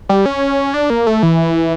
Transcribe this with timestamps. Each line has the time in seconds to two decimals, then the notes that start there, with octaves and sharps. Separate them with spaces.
0.09 G3
0.26 C#4
0.74 D4
0.90 A#3
1.07 A3
1.23 E3